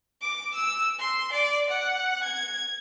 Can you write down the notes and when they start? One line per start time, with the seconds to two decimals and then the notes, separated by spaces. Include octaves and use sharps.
0.21 D6
0.54 E6
0.98 C6
1.32 D5
1.70 F#5
2.24 G#6